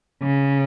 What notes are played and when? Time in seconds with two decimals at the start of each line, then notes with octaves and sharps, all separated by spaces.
0.22 C#3